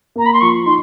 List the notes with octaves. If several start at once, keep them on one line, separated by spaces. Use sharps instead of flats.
A#3 A#5
B5
C6
F3 C#6
D#4 C6